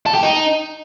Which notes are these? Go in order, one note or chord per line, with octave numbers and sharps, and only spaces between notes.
A4
G4
D#4